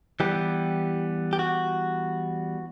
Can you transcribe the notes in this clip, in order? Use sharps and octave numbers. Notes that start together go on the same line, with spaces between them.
E3 G3 B3 G4
G4
F#4